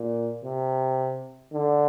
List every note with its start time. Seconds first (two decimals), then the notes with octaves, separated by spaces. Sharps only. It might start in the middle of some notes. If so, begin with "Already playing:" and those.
Already playing: A#2
0.45 C3
1.54 D3